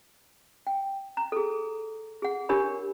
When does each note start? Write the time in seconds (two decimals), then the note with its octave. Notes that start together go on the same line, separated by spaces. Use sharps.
0.67 G5
1.17 A#5
1.32 G#4 A4
2.22 G#4 F#5
2.49 D4 G4 A#4 C#5 B5